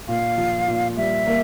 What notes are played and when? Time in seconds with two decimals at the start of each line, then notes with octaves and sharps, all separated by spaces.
0.08 A#2 F5
0.37 F3
0.68 A#2
0.97 G3 E5
1.27 A#3